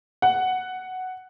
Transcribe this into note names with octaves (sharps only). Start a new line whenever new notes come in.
F#5